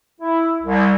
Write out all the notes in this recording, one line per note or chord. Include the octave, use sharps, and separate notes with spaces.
E4
C2